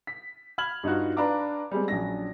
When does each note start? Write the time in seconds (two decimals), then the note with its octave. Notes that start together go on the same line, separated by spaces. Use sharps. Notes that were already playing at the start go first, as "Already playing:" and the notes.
0.07 B6
0.58 B5 F6 G#6 F#7
0.83 G2 D#4 F4 F#4
1.17 D4 B4 F5 A#5 D6
1.71 G3 G#3 C4
1.88 A#1 F#3 C#4 D4 A#6